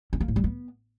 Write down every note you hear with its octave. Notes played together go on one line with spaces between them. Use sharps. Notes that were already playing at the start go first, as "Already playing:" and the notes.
C#4
A#3
A2
G3
B3